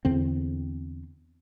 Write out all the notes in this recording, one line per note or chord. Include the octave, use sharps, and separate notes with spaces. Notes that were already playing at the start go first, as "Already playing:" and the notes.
E2 D3 C4